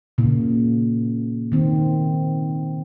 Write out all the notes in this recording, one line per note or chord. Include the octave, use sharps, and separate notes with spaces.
A#2 C#3 A#3
D#3 C4